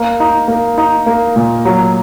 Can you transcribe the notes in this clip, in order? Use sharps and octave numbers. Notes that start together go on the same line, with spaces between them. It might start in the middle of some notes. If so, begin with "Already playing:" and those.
Already playing: A#3
D#4
A#3
D#4
A#3
A#2
F#3